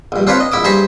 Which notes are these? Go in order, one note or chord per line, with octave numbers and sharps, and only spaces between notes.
A#1 G2
C4 D4 F4 B4 C#5
D#5
A#1 E4 D6 D#6
G2 G#4 C5 A#5 B5 C#6